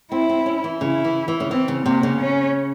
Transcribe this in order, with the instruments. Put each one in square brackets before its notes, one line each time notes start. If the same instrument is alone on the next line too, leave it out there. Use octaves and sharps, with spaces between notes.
[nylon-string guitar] C4 [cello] E4
[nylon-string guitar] C4
C#4
E3
[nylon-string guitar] C#3 [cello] E4
[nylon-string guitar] E3
E3
C#3
[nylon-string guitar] E3 [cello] C4
[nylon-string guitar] C#3
[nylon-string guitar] C3 [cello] A#3
[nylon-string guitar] C#3
[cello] C#4